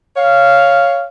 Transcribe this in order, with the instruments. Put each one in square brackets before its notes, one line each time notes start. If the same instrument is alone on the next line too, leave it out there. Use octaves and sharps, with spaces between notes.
[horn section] C#5 F5